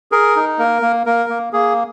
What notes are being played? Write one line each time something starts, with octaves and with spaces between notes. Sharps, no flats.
G#4 A#4
D#4
A#3 A#4
A#3
A#3 A#4
A#3
A#3 G#4